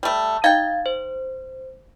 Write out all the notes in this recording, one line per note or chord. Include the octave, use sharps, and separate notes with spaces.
G3 A3
D#4 F5 G5 G#6 A6
C5